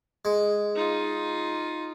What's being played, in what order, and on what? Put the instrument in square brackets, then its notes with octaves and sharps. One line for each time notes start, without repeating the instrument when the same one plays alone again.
[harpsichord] G#3
[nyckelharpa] D#4 F4